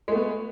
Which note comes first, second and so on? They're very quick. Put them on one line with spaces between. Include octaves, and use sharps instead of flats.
G#3 A3 B3